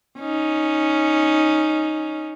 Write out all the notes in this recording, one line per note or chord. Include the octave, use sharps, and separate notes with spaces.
C#4 D#4